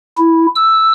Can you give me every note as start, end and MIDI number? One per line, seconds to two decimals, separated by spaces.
0.18 0.47 64
0.55 0.93 88